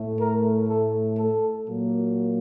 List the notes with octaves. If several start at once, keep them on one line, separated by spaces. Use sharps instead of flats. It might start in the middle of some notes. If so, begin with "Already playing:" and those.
Already playing: A2 A3
A#4
A4
A4
A#2 F#3 A#3